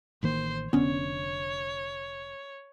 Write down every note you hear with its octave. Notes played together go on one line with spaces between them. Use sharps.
A1 D#3 A#3 C5
F1 A#1 D3 B3 C#4 C#5